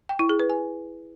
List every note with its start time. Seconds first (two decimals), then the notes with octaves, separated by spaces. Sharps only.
0.09 G5
0.19 E4
0.29 G#4
0.40 B4
0.50 G#5